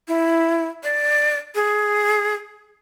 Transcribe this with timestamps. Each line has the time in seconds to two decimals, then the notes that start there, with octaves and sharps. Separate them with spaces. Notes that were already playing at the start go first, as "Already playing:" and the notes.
0.08 E4
0.84 D5
1.55 G#4